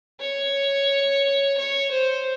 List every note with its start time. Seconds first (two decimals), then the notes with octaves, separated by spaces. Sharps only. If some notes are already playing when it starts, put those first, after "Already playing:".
0.21 C#5
1.57 C#5
1.91 C5